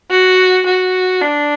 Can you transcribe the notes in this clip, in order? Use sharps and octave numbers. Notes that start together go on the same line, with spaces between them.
F#4
F#4
D4